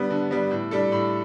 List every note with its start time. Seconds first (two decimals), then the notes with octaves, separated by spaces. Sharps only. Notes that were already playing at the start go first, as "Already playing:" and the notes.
Already playing: D3 G3 B3
0.10 D3
0.31 G3 B3
0.51 A2
0.71 G3 D4 A4
0.92 A2